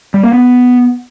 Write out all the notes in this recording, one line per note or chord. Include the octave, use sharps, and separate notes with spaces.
G3
A#3
B3